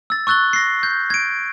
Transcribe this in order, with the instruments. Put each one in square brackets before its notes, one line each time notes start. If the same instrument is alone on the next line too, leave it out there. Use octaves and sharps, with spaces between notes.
[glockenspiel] E6 A6
C#6 E6 F#6 A6 G7
A#6 C7
G6
G#6 D7